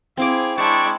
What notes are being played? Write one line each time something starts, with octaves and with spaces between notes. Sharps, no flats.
C4 E4 G#4 F5 D6
G#3 D4 E4 G5 A5 C#6